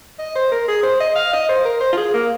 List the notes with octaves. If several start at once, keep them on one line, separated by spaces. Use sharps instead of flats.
D#5
C5
A#4
G#4
C5
D#5
F5
D#5
C5
A#4
C5
F4
G#4
A#3